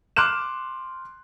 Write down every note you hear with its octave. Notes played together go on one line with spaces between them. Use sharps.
C6 D6 F6 F#6 E7